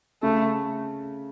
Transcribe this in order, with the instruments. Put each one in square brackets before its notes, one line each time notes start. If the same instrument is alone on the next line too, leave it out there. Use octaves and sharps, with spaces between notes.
[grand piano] C#3 [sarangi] A3